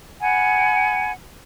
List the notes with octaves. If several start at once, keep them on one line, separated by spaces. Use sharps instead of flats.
F#5 G#5 B5